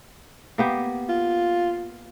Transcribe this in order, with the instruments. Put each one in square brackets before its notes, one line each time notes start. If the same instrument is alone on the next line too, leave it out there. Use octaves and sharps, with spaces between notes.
[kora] A#3 B3 G4
[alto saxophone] F4